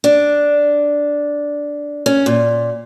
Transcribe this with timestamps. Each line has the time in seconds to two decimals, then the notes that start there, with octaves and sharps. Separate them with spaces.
0.04 D4
2.06 C#4
2.26 A#2